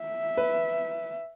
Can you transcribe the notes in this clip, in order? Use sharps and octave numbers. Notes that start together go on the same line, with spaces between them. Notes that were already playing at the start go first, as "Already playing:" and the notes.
Already playing: E5
B4